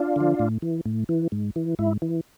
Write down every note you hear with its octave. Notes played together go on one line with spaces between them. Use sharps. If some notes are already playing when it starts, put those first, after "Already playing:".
Already playing: D4 F4
D3 F3
A2
E3
A2
E3
G#2
E3
G#2 E4
E3